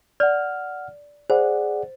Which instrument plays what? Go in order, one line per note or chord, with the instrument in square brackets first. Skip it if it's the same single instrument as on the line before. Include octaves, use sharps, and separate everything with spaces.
[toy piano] D5 [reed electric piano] F#5 F6
[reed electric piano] G#4 D5 F#5 [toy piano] C5